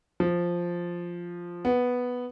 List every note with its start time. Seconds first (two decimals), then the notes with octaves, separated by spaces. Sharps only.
0.20 F3
1.65 B3